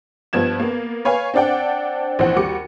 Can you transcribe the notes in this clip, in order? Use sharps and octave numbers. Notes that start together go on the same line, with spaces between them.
G2 F3 B3 G#6 E7
A#3 B3
B4 C#5 F5 G#5
C4 D4 D5 F#5 G5
A#1 E3 C4 C5 F#5
D#2 G3 F#4 D6 C#7